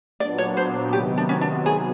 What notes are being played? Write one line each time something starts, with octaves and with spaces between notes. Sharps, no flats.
A#2 F#3 B3 D4 D5
C#5
C5
C3 D#3 F#3 B3 G4
D4
C#4
D4
G#4